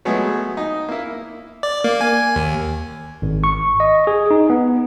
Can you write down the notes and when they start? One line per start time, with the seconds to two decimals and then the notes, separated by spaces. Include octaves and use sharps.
0.05 F#3 G#3 A3 B3 G#4
0.57 D#4
0.89 A#3 E4
1.63 D5
1.84 A#3
2.01 G#5
2.36 D#2
3.22 G#1
3.44 C#6
3.80 D#5
4.07 G#4
4.31 D#4
4.50 B3